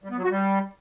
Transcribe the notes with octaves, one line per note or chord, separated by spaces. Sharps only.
G3
B3
F#3
F#4
G3